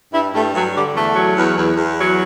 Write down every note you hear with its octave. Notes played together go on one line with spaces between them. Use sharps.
G2 E4
G2 A3
G2 F#3
D3 G3
E2 A3
F#3
E2
E2
E2
F#3